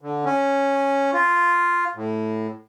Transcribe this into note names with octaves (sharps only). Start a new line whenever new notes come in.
D3
C#4
F4
A2